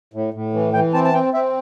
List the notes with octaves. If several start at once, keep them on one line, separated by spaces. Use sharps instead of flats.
A2
A2
E3
E3 G5
C4 A5
A5
C4 G5
C4 E5